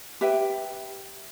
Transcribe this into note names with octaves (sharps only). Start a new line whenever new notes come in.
G4 B4 E5 G5